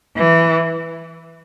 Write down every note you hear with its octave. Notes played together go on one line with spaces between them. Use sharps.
E3